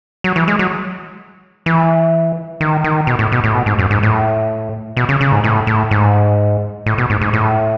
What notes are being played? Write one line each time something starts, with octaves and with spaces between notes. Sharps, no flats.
F#3
E3
G#3
F#3
E3
D#3
D#3
B2
A2
B2
A2
B2
G#2
F#2
G#2
A2
B2
C#3
C#3
G#2
A2
A2
G#2
A2
B2
G#2
G#2
A2